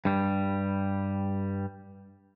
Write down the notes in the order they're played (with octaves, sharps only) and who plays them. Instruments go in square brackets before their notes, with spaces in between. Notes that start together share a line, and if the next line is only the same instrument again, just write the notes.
[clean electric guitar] G2 G3